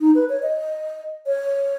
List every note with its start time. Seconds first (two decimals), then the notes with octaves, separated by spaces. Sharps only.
0.01 D#4
0.15 B4
0.29 C#5
0.43 D#5
1.26 C#5